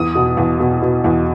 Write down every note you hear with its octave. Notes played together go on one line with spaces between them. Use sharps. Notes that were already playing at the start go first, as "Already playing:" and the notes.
Already playing: E2 D#6
B2
E2
B2
B2
E2